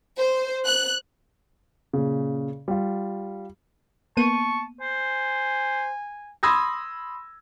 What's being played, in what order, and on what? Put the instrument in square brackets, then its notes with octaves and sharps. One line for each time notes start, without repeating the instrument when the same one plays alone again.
[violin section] C5
F#6
[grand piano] A#2 C#3
G3 F4
[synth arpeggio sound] A#3 B3 D#7 [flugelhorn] A5 [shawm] C#6
[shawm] C5 [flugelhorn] G#5
[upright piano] B5 C6 D#6 E6 G#6 A#6